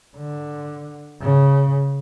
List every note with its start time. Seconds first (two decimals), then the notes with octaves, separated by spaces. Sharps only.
0.17 D3
1.22 C#3